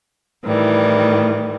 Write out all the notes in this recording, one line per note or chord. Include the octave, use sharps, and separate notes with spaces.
A2 D#3 E3 G3